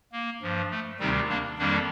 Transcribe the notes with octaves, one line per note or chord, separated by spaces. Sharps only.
A#3
G2 F3
A3
D2 C3 D#3 G3 C4 D#4
A#3 D4
F2 D#3 G3 A#3 D4